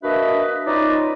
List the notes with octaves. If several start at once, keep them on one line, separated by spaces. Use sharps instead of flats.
A#3 D4 F#4 B4 D#5 E5
C#4 D#4 F4 B4 D5 D#5